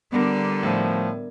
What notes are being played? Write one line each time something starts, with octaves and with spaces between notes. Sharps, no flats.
D3 G3 B3 D4 A#4
A2 F3